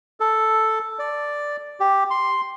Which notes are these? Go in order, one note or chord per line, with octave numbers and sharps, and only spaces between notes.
A4
D5
G4
C6